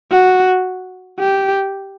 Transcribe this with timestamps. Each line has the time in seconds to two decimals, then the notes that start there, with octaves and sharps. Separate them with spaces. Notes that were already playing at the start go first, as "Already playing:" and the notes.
0.11 F#4
1.20 G4